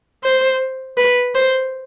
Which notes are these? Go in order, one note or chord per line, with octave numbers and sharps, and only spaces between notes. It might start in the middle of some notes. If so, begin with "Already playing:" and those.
C5
B4
C5